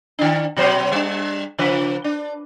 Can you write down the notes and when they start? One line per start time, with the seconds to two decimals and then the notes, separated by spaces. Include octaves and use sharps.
0.19 D#3 D4
0.57 B2 F#3 C5
0.92 G3 D4
1.58 C#3 F3 B4
2.04 D4